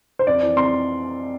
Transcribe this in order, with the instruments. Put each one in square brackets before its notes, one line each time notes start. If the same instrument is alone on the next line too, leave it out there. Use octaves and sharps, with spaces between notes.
[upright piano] C5
[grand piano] F2 [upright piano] D5
[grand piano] E3
[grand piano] C4 [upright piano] C6